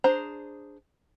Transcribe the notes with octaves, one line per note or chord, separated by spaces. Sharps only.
D4 G#4 C5 A#5